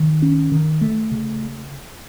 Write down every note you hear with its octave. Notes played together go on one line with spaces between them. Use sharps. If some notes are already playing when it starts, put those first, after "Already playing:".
Already playing: D#3
C#4
D#3
A3
C#3